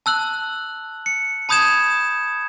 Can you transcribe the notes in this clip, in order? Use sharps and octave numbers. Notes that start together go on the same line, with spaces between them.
A5 E6 F#6 F#7
C#7
A5 B5 D#6 G6 G#6 E7